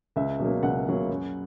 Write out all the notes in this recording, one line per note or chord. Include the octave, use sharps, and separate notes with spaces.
C#2 E5
B2 F#3 A#3
C#2 F#5
B2 F#3 A#3
F#2